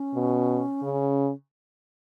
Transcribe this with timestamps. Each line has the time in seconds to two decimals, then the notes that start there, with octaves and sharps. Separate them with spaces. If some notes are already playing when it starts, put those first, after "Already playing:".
Already playing: C#4
0.15 B2
0.82 C#3